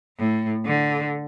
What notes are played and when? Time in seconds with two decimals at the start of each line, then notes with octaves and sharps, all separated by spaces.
0.18 A2
0.66 D3